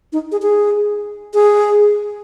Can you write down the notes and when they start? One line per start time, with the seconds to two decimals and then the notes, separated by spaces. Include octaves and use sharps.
0.13 D#4
0.32 G#4
0.42 G#4
1.34 G#4